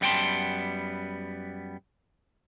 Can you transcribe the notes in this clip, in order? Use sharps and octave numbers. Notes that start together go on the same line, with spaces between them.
F#2 G3 B3 G5 A5 C6